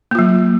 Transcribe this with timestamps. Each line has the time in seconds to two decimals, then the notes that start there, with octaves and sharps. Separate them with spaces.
0.11 A#3
0.15 F4
0.19 F#3